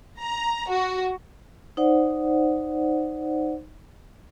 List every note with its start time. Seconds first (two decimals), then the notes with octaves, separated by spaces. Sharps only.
0.21 A#5
0.69 F#4
1.77 D#4 C5 D5 F#5